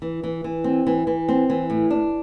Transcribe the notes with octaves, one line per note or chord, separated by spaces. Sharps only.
E3
E3
E3
C4
E3
E3
C4
E3
A2
D4